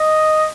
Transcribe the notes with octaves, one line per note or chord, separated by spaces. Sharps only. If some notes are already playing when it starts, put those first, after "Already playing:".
Already playing: D#5